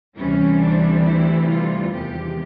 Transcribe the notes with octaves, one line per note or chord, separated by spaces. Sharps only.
D2 C3 E3 G3 C#4
D4
E4
F4
E2 C3 D#3 G#3 G4